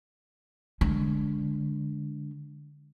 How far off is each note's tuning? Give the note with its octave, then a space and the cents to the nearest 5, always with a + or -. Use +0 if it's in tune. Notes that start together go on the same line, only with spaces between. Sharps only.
D3 -10 G#3 +0